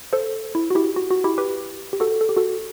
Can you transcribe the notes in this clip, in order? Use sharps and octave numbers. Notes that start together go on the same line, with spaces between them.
A4 C5
E4
F#4
E4 G4
F#4
F#4
E4 G4
G4 B4
G4
F#4 A4
A4
G4
F#4 A4